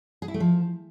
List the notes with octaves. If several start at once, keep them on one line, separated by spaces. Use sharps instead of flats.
G#4
E4
A3
F3